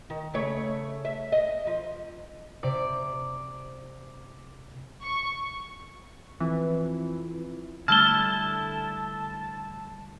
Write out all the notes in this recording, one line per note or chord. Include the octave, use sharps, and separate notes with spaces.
D#3
C#3 A3 C#5
E5
D#5
F3
C3 D5 D7
C#6
F2 E3
D3 G3 A3 E4 A4 A5 F6 G7